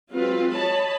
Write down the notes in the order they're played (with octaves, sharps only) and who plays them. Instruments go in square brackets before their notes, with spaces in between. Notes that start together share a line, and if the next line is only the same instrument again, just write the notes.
[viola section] F#3 G#3 C4 F4 B4
C#5 D#5 A5 B5